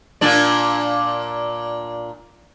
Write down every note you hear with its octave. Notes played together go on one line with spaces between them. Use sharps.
A#2 D4 D5